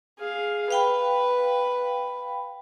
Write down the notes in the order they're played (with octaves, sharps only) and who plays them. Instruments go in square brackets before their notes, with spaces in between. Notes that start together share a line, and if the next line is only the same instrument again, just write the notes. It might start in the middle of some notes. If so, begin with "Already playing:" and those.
[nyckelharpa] G#4 F5
[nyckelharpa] B4 [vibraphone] F5 G5 B5